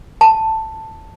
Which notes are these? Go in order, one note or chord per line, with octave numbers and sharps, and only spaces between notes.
A5